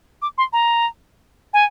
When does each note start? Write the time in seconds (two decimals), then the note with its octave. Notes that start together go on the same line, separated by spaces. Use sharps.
0.22 D6
0.38 C6
0.53 A#5
1.54 G#5